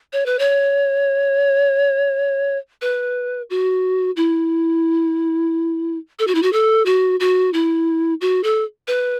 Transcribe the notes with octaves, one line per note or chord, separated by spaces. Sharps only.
C#5
B4
C#5
B4
F#4
E4
A4
F#4
E4
F#4
A4
F#4
F#4
E4
F#4
A4
B4